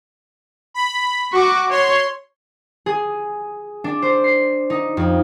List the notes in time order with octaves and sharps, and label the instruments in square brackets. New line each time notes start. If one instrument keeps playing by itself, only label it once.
[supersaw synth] B5
[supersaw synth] F#4 [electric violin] C#6 D6
[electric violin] C#5 [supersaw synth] C6
[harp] G#4
D4
C5
C7
D#4
F2